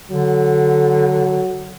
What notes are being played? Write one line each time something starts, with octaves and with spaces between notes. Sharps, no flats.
D3 F#3